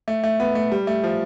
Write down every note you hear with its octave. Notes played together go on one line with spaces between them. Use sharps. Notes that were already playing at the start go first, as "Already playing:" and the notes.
A3
A3
B3
A3
G3
A3
F3